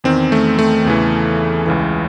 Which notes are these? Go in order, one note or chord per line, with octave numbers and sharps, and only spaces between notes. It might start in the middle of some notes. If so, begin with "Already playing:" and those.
E2 D#3 C4
A3
A3
E2 C#3 E3
C#2 C#3 E3